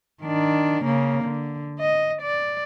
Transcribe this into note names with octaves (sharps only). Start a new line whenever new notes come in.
D#3 D4
C#3 A#3
D3
D#5
D5